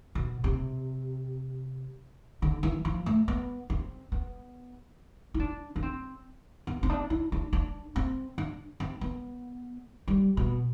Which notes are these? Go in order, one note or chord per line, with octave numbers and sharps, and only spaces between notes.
B2
C3
D3
E3
F3
A3
B3
C4
B3
E4
D4
D4
C4
B3
C4
D4
E4
D4
D4
C4
D4
C4
B3
G3
B2